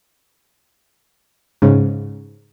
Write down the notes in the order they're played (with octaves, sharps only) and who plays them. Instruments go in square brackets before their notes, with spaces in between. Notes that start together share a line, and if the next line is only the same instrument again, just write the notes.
[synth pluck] G#2 C#3